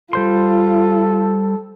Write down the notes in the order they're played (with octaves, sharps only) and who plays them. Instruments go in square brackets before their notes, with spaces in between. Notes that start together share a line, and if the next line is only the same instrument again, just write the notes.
[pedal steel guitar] G3 C5 C6 [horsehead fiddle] F4 [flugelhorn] A4